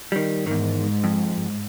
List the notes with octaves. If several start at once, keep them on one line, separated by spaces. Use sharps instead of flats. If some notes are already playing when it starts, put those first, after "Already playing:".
D#3 G3
E2 G#2 D#3
F2